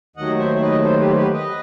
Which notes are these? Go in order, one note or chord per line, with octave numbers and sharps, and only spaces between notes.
D#2 D#3 F#3 A3 D#5 F#5
C5 E5
E5
B4 D#5
A4 C5
G4 B4
C5
G4 B4
B4 D#5